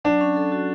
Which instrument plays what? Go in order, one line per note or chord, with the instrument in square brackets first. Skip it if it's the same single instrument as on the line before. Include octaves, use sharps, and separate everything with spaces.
[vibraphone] F#3 [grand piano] D4
[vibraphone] C#4
A4
F#4